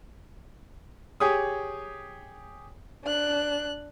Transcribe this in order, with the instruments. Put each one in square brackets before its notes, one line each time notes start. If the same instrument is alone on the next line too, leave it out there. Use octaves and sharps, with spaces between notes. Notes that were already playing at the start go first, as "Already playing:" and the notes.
[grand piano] G4 G#4 C#5 D#6
[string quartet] D4 F#6